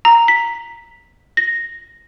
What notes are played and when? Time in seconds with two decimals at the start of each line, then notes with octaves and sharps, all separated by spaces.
0.05 A#5
0.28 B6
1.37 A#6